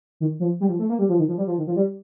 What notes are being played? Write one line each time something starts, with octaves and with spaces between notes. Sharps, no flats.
D#3
F3
G3
F3
A3
A#3
G3
F3
D#3
F3
G3
F3
D#3
F3
G3